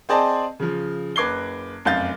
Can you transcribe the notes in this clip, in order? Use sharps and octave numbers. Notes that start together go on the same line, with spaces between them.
C4 G#4 C5 D5 D#5 A5
C#3 F3
F#1 B4 D6 G#6 C7 G7
F1 F#2 F5 G6 A6